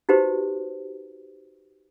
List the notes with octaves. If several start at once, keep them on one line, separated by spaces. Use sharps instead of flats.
D#4 F#4 G4 B4 C5